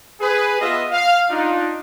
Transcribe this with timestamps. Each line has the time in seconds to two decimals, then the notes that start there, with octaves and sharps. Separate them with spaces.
0.21 G#4 B4
0.61 B3 F4 D#5 E5
0.91 F5
1.30 D4 D#4 F4